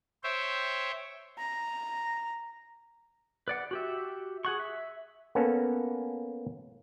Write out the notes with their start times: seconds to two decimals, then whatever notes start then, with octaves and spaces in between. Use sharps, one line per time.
0.24 C5 C#5 E5 G5
1.38 A#5
3.48 B4 D5 F#5
3.71 F#4 G4 E5
4.45 G#4 F#5 C#6
4.60 E5
5.35 A#3 B3 C#4 A4